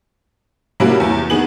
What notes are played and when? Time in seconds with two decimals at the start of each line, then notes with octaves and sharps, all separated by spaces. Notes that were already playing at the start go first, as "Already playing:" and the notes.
0.80 C3 G3 A#3 C#4 E4 F#4
1.00 E2
1.30 D#3 B3 G#4 F#7